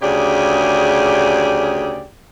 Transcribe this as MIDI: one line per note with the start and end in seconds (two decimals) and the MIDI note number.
0.02 2.05 38
0.02 2.05 49
0.02 2.05 67
0.02 2.05 68
0.02 2.05 74